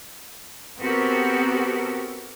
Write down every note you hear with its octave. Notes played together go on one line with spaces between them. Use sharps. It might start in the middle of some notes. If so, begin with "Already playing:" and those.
B3 C4 F#4 G4 A4 A#4